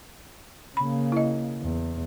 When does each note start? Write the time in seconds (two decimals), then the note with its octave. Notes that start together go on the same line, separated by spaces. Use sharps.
0.77 C#3 A#3 B5
1.12 E4 D#5
1.61 E2